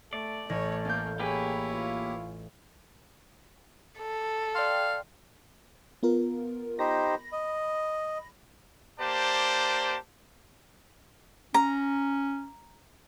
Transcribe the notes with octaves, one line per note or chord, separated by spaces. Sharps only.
A3 D5
A1 A3 C#5 A#6
A#3 C#4 G6
A#3 E4 G4 G#4 B4 C#5
F4
A4
D5 F5 G5 C6
B3 F4 A#4
D#4 G4 C5 B5 A#6
D#5
A#3 G4 C5 D5 A5
C#4 A#5